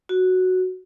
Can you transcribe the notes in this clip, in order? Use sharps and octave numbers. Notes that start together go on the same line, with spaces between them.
F#4